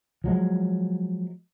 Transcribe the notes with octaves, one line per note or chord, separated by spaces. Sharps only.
F3 F#3 G#3